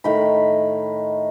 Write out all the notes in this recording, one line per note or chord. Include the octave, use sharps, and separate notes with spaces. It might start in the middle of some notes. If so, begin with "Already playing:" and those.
A2 D#3 B5